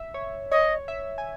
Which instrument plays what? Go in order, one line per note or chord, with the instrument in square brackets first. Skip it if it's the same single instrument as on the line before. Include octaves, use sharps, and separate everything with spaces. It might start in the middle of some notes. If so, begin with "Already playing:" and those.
Already playing: [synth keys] E5
C#5
[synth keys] C#5 [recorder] D#5
[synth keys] E5
G#5